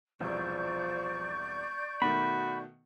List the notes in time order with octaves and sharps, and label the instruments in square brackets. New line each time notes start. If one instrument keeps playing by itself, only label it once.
[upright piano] E1 C2 [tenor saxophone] F3 [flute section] D5 C#6 G6
[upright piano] B2 D#3 A3 [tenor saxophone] F#4 [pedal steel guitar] B5